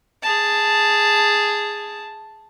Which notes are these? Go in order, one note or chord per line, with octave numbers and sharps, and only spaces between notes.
G#4 A5